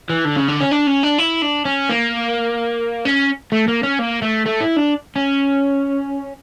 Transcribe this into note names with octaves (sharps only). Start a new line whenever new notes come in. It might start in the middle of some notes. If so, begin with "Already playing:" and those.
E3
D3
C#3
D3
C#4
D4
C#4
D4
E4
D4
C#4
A#3
C#4
A3
A#3
C#4
A#3
A3
A3
E4
D4
C#4